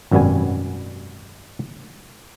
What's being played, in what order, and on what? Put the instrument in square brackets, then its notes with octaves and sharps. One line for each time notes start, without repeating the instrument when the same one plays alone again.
[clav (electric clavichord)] G#1 F#2 B2 G3 B3 G#5